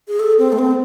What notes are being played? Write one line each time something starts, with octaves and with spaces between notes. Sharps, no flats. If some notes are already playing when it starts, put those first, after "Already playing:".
G#4
A4
C4
A3
C4